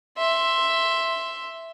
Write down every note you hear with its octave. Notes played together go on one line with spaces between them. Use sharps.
E5 C6